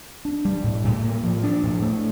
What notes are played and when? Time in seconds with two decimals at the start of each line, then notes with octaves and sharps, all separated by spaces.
0.25 D4
0.45 G3
0.64 A2
0.84 A2
1.04 A#3
1.23 F3
1.43 D4
1.63 A2
1.82 A3